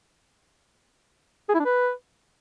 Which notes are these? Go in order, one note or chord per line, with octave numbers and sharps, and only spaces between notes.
G#4
E4
D4
B4